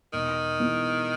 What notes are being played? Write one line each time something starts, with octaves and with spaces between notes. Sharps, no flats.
E1 D#3
E2